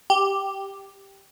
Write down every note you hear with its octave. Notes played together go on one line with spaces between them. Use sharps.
G4